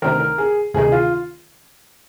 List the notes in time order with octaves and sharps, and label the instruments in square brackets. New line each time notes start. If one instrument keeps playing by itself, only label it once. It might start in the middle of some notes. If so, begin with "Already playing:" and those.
[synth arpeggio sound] D2 C3 D#3 [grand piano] A#4
[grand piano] A#4
G#4
[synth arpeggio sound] D2 C3 D#3 [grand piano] G#4
[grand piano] F4